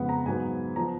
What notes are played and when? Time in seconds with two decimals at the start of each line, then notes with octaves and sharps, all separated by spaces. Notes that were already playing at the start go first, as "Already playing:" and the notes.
Already playing: F2 C#3 G#3 B3 F#5
0.09 A#5
0.26 G#2 F#3 B3 G#5
0.76 F3 B3 A#5